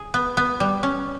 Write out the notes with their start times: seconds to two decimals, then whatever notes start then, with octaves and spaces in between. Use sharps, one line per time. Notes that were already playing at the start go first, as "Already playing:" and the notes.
Already playing: G#4
0.14 B3
0.37 B3
0.60 G3
0.83 C#4